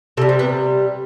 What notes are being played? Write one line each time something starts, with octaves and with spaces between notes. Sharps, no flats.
C3 G3 A4
C4
B3